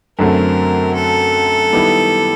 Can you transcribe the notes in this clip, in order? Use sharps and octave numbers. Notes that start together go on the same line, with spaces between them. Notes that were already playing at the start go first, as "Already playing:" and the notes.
F#2 D3 F#3 A3 C4 A#4
A4
D#3 G3 B3 E4